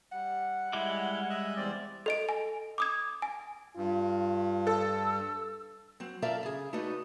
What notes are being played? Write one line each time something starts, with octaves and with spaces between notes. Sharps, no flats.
G3 F#5
G3 G#3 E4 D6
D#5 E5 F#6
E2 C4 D5
A4 D#5 D7
G#5
D6 D#6 G#6
G#5
G2 F4
A4 E6
F#3 C4
F4 A4 A#4 D5 E5 F5
C#3 G#4
A3 D#4 F#4 B4 D5 D#5